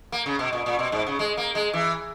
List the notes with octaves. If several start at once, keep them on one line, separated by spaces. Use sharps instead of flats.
A#3
C#3
B2
A#2
A#2
B2
G#2
C#3
G#3
A#3
G#3
E3